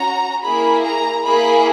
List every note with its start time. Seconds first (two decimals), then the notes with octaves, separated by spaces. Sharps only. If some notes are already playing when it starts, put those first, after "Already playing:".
Already playing: C#4 F#4 A#5
0.45 A#3 E4 G#4 B5
0.86 A#5
1.26 A#3 E4 G#4 B5